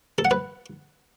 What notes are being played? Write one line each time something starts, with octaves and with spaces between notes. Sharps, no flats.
A4
F#5
B4